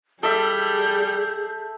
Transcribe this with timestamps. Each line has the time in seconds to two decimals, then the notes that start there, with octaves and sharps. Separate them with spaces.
0.23 G3 G#4 A4 E5 G6